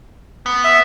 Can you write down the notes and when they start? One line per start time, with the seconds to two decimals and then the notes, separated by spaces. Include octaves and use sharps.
0.46 B3
0.64 E5